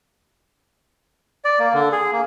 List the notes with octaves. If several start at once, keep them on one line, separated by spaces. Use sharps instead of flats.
D5
A#3
D3
G#4
A#3